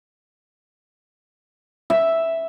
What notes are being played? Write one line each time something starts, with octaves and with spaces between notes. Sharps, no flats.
E5